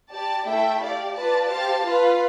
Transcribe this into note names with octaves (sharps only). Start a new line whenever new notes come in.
G4 D5 A5
A3 E4 A4 E5 G5
G4 D5 F5
F4 B4 D5 A5
G4 C5 F5 A5
F4 B4 F5